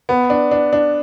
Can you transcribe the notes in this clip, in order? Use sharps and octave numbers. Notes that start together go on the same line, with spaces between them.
B3
D4
D4
D4